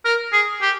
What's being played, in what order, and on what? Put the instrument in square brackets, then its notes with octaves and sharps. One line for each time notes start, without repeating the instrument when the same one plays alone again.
[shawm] A#4
G#4
G4